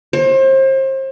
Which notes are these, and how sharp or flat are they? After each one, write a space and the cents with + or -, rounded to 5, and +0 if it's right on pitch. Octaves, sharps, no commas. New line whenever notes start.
C5 +35